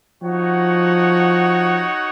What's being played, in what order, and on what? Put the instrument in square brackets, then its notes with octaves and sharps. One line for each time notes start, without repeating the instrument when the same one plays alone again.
[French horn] F3 [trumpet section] D#4 F#4 C#5 F#5